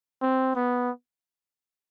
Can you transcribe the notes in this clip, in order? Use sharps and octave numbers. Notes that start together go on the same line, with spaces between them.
C4
B3